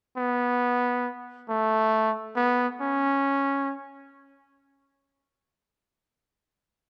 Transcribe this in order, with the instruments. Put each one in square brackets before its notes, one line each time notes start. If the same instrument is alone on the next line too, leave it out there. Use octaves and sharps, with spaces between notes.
[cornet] B3
A3
B3
C#4